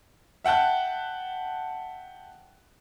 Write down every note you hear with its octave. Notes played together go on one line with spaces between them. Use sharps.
E5 F#5 G5 A5 F#6